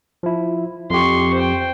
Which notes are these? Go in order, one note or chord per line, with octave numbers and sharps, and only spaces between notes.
F3 E4
F2 G4 C6 C#6
C5 G5